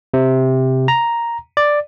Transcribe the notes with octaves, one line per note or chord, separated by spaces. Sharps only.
C3
A#5
D5